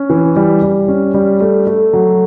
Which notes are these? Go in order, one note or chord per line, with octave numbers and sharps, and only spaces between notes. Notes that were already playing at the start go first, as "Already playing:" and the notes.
Already playing: C#4
E3
G3
G3
C#4
G3
A3
A3
F#3